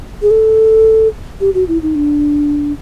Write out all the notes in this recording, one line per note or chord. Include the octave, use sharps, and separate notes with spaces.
G#4
A4
G4
F#4
E4
D#4
D4